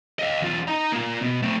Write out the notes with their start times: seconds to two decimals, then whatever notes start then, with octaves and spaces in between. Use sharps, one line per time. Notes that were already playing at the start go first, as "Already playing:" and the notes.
0.19 D#5 F5
0.42 E2 F4
0.68 D#4 A#5
0.92 A#3 F4
1.22 B2
1.42 A3 C4